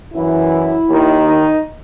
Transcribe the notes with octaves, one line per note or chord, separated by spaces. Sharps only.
F#2 E3 E4
D#2 D#3
D#4